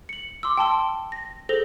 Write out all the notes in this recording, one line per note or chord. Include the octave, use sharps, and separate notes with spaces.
C#7 F#7
C6 D6 E6
G5 A5 C6 E6
A#6
G#4 A4 C5 A#6 F7 G7